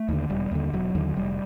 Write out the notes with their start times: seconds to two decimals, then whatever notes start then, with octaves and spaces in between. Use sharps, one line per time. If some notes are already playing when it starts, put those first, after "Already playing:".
Already playing: A3
0.08 D#2 D3
0.29 E1 G3
0.51 D#2 D3
0.73 E1 F#3
0.95 D#2 D3
1.16 F1 G3